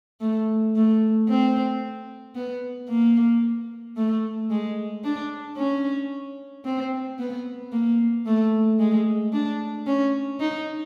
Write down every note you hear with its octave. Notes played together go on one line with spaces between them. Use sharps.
A3
A3
C4
B3
A#3
A3
G#3
D4
C#4
C4
B3
A#3
A3
G#3
D4
C#4
D#4